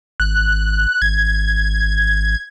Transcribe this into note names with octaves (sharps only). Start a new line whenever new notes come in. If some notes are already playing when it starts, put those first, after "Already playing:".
G#1 F#6
G#1 G#6